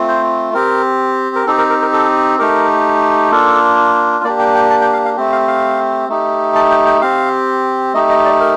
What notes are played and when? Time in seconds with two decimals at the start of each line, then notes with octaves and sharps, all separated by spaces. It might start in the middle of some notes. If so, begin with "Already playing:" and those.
Already playing: A3 C4 F4
0.08 C5
0.54 C4 G4 A#4
1.36 A#4
1.46 C4 D#4 G4 A4
1.58 A#4
1.70 A#4
1.82 A#4
1.93 A4
2.39 A3 D#4 G4 A#4
3.31 A#3 D4 F4 A4
4.24 A#3 D4 G4 D5
4.40 G5
4.55 G5
4.71 A5
4.81 G5
4.93 F5
5.05 F5
5.16 A3 C4 G4
5.32 F5
5.48 F5
6.09 A3 D#4 G4
6.55 A5
6.71 G5
6.86 G5
7.01 C4 G4 F5
7.94 A3 D#4 G4 D#5
8.10 D#5
8.25 D5
8.40 A#4